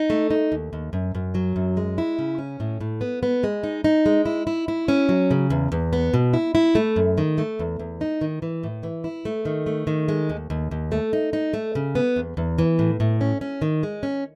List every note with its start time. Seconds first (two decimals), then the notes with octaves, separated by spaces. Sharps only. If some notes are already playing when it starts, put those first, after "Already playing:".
Already playing: D#4
0.10 A3
0.30 D#4
0.52 D#2
0.73 D#2
0.93 F#2
1.15 F#2
1.35 F#3
1.56 F#2
1.77 G#3
1.98 E4
2.19 C#3
2.38 C#4
2.60 A2
2.81 A2
3.01 B3
3.23 B3
3.44 G#3
3.63 D#4
3.84 D#4
4.06 G#3
4.26 E4
4.47 E4
4.68 E4
4.88 C#4
5.09 F#3
5.31 C#3
5.50 E2
5.72 E2
5.93 B3
6.14 B2
6.33 E4
6.55 E4
6.75 A3
6.96 F#2
7.18 D#3
7.38 A3
7.59 E2
7.79 E2
8.01 D#4
8.21 D#3
8.42 E3
8.63 A2
8.83 E3
9.04 E4
9.25 A3
9.45 D#3
9.66 A3
9.87 D#3
10.08 G#3
10.29 D#2
10.50 D#2
10.71 D#2
10.92 A3
11.13 D#4
11.33 D#4
11.54 A3
11.75 C#3
11.95 B3
12.16 E2
12.37 E2
12.58 E3
12.79 A2
13.00 A2
13.21 C#4
13.41 C#4
13.62 D#3
13.83 G#3
14.03 C#4